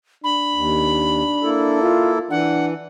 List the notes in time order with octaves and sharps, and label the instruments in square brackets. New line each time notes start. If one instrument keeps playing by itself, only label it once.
[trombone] D4 [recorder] B5
[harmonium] D#2
A#3 E4 A4
[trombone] F4
[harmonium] E3 [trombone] D4 [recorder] F#5